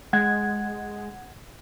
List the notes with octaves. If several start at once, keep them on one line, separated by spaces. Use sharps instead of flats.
G#3 F#5 G#6